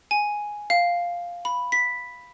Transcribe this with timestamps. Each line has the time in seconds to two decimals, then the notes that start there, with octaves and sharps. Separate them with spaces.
0.11 G#5
0.70 F5
1.45 B5
1.72 B6